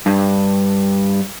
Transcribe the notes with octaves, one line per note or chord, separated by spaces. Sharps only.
G2